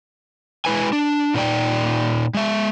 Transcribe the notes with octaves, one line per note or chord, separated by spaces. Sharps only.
G#3 E4 B4 G#5
D4
A#2 D#4 D5 G5
G#3 E5